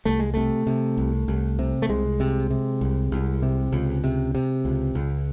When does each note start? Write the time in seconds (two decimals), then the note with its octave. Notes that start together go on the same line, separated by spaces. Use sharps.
0.05 C2 A3
0.19 G#3
0.34 C3 A3
0.67 C3
0.97 C2
1.28 C2
1.59 C3
1.82 A3
1.89 C2 G#3
2.20 C3
2.50 C3
2.81 C2
3.12 C2
3.42 C3
3.72 C#2
4.04 C3
4.35 C3
4.65 C#2
4.95 C#2